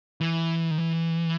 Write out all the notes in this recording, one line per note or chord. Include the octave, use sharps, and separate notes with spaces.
E3
D#3
E3